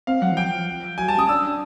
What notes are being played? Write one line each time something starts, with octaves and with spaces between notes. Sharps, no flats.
C4 F5
F#3 F#5
E3
F3 G5
F#3 G#5
G3 A5
C#4 D#6
D4 E6